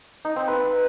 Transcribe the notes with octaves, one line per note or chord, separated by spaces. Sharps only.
D#4
C4
B4